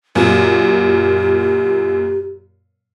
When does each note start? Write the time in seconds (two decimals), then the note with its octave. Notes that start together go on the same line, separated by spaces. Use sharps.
0.15 F#2 A#2 G4